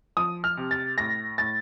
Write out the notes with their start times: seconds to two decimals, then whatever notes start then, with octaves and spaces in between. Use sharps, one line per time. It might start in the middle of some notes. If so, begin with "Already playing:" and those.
0.17 F3 D#6
0.44 F6
0.57 C3
0.71 A6
0.98 A2 A#6
1.38 A2 A6